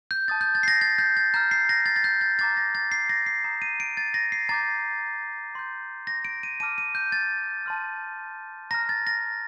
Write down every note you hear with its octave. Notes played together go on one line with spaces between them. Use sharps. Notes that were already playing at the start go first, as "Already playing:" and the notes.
G6
A5 D#6 G6 A6
G6
A6
C7
A#6
A6
G6
A6
A#5 F6 G6
C7
A#6
A6
A6
G6
A6
A#5 D6 F6 A6
A#6
A6
C7
A#6
C7
A#5 D#6 G6
D#7
D7
A6
A#6
C7
A#5 D6 G6 A6
C6 G6
A#6
D7
D#7
A5 D6 F6 D#7
D#7
G6
A6
A5 C6 F6
A#5 F6 A#6
A6
A#6